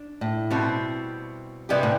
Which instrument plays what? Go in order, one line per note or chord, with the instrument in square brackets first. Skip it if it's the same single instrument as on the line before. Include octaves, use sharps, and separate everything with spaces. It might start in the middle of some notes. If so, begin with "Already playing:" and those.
Already playing: [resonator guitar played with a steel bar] D4
[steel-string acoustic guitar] A2
[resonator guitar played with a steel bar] B2 G3 C4 F#4
[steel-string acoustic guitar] G2 [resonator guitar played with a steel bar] C3 E3 B3 E4 G4
[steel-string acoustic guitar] A2